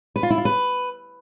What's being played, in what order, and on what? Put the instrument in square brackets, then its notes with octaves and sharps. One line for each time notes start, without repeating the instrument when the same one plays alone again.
[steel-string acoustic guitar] B4
F4
E4
F4
B4